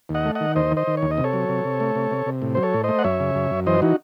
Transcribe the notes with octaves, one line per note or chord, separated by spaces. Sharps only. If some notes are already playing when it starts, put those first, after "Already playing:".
D#2
D#5 F#5
A3
D#3 D#5 F#5
D#2 C5 D#5
D#3
C5 D#5
D#3
C#5
D#2
D#5
C3
A4 C#5
F#3
C3
C3
A3
C3
C3
C3
A2
F#3 C5
A4 C#5
A2
A3 C5 D#5
F#5
F#2 C#5 E5
C#3
F#2
F#2
E3 C5 D#5
E3 D#4 F#4